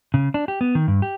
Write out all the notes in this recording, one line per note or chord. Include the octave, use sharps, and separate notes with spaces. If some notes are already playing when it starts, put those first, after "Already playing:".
C#3
D4
G4
B3
D#3
G2
G4